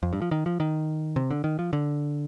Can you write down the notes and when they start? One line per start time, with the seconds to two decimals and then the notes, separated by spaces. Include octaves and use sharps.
0.03 F2
0.13 G2
0.22 F3
0.31 D#3
0.46 F3
0.60 D#3
1.16 C3
1.31 D3
1.44 D#3
1.59 F3
1.73 D3